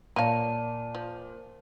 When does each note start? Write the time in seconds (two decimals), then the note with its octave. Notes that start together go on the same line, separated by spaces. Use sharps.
0.16 A#2 A#3 C#5 D5 F5 A5 D#7
0.95 F3